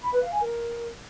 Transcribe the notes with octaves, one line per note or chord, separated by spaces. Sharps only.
B5
B4
F5
G#5
A#4